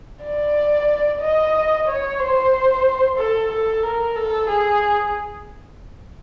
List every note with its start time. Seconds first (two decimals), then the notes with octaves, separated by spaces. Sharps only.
0.24 D5
1.22 D#5
1.87 C#5
2.20 C5
3.18 A4
3.51 A4
3.83 A#4
4.16 A4
4.50 G#4